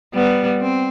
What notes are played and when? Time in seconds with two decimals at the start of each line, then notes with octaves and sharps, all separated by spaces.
0.14 G3 B3
0.61 C4